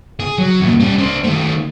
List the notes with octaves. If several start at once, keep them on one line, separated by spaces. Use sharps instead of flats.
G#4
F#3
E2 A#2
G3 C#4
D4 C5
D#3 A3